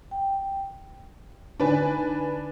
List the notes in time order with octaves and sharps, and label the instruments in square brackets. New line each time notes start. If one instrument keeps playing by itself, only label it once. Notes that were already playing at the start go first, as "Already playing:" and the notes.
[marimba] G5
[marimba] D3 D#4 [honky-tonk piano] D4 B4 G#5